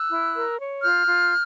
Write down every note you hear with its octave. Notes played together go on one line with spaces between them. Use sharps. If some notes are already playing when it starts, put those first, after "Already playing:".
Already playing: E6 F#6
E4
A#4
C#5
F4 F6 G6
F4